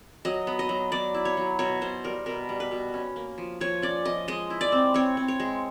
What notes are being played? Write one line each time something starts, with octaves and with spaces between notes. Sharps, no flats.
F#3 D#5
B3
D#5
F#3
F#3 D5
E4
C#5
F#3
B2 C#5
B2 C5
G3 A#4
B2 A#4
G3
B4
B2
C#4
A#3
F3
F3 C#5
C#4 D5
F3 D#5
G#3 D#5
E4
D5
C4
C4 C#5
C4
C#5
G#3